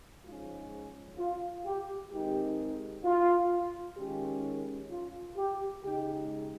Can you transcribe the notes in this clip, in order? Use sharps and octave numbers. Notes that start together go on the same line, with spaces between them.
G#2 F3 G#3 C#4 F4
F4
G4
D#3 G#3 C4 D#4 G4
F4
D#3 G#3 C#4 G4
F4
G4
C#3 G#3 D#4 G4